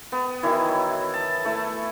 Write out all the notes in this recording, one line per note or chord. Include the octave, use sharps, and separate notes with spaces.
B3
D#3 E3 F#3 E4
A5
A3 E4